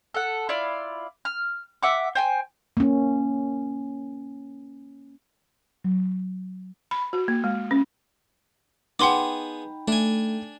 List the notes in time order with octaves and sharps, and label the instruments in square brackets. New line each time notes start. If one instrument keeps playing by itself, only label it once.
[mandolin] A4 F#5
E4 F4 D5
F6
E5 F#5 D6
C5 G5 G#5
[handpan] A#3 C#4
[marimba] F#3
[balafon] B5
F#4
A#3
G#3
C#4
[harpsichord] B3 G#4 [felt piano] D#4 G5 B5 [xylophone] F#5 C6 D6
[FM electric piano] A3 [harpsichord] D4 G#5